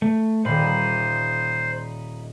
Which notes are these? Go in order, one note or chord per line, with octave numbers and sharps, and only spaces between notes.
A3
D#1 A#2 D#4 C5 B5